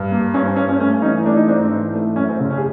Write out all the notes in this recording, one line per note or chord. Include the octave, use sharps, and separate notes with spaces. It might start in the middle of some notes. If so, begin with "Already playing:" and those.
Already playing: G2
A#3
G2 C#4
C4
G2 C#4
C#4
A3 C#4
E3 C#4 D#4
A3 D4
D#4
G#2 C4 D4
E3
A3
F#2 C#4
C4
C#3 C#4
C#4
G#4